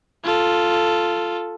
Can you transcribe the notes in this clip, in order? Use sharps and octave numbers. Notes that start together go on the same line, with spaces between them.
F4 A4